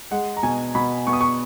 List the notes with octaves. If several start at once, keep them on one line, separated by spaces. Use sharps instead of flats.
G#3 F#5
A#5
B2 G#5
B2 B5
B3 C#6
D#6
C#6